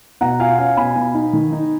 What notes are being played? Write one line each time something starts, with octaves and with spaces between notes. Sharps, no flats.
B2 F#5 A#5
F4 F5 G#5
C#4 F5 G#5
B2 G#5 B5
B2
D#4
D#3
D#4